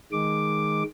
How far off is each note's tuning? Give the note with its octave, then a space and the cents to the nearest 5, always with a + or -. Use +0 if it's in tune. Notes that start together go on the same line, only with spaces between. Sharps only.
D#3 +0 G#3 +0 D6 +0